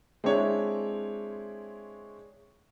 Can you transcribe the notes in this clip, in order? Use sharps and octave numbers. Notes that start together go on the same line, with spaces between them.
G#3 C4 D4 E4 C#5